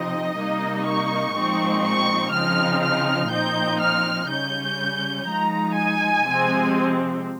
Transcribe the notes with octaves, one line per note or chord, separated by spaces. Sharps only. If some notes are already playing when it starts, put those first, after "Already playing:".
Already playing: C3 F3 C4 D#4 D#5
C3 G3 A#3 D#4
C#6
A#2 F3 G#3 C4 D#4
C#6
C#3 F3 C4 D#4 F6
F6
A#2 F3 C4 D#4 G6
F6
C#3 G3 C#4 G6
F3 G#3 D#4 A#5
G#5
C3 F3 G#3 C4